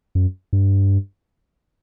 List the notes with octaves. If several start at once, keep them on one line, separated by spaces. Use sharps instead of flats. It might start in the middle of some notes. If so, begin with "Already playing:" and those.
F#2
G2